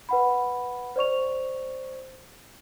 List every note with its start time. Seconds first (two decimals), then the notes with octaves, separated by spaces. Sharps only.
0.09 B4 F#5 B5
0.96 C5 D5 C#6 F7